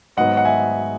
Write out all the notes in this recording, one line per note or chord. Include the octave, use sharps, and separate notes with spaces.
G#1 G#2 F#3 B3 D#5 F#5
F#5
E5 G#5